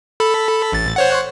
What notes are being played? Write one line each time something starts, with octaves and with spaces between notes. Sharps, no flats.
A4 B5
A1 A6
C5 C#5 F#5